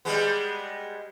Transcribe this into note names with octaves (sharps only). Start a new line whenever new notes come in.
G3 G#3 B3